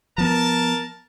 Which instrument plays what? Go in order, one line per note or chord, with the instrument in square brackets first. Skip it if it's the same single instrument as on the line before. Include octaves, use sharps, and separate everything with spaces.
[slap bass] F3 B3 [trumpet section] A#4 A5